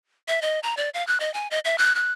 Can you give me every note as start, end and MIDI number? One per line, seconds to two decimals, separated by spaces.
0.28 0.40 76
0.42 0.60 75
0.63 0.75 82
0.77 0.90 74
0.94 1.06 77
1.07 1.18 90
1.20 1.33 75
1.34 1.47 80
1.51 1.59 75
1.65 1.78 76
1.78 1.95 90
1.95 2.13 90